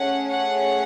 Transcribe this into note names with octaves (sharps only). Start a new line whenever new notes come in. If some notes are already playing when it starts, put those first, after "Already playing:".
Already playing: A3 C#4 G#4 F#5
F#5